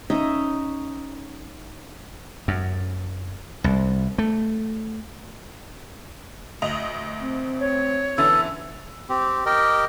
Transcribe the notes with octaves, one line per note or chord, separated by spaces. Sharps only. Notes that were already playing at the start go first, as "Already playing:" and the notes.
C#4 D#4 D#5 E5
F#2
C2
A3
D2 D#5 F7
C4
C#5
D3 E3 B3 A4
C4 G4
G4 A#4 D#5 G5